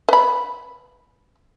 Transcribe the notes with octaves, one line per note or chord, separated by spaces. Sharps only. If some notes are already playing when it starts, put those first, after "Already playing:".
B4 B5